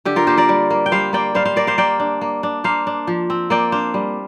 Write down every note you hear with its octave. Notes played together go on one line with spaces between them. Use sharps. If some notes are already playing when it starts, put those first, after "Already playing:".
D3 G4
F4 A#4
A#3 G4 C5
A#4 D5
G3
A#3
G5
G3 C5 F5
A#3 D5 G5
G3 C5 F5
C5 F5
A#3 A#4 D5
C5 F5
A#3 D5 G5
D4
A#3
D4
A#3 C5 F5
D4
F3
C4
A#3 D5 G5
D4 C5 F5
G3